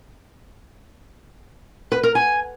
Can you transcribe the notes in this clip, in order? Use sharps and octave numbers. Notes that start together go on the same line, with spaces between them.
B4
A#4
G#5